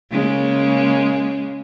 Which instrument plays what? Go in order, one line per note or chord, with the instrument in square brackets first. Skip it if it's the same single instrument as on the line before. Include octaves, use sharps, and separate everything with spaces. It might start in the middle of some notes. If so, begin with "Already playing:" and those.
[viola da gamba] C#3 G#3 A#3